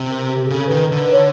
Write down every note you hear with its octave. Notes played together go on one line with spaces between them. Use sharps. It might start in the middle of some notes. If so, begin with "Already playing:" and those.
Already playing: C3
A#4
G4
G#4
C#3 A4
D#3 B4
A#4
D3 B4
C#5